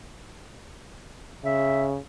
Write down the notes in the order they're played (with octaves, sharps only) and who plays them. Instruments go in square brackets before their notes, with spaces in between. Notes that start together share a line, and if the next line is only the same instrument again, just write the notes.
[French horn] C#3 [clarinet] E5